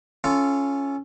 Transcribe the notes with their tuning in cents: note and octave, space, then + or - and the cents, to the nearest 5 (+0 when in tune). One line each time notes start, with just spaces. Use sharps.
C#4 +0 F4 -20 A4 +0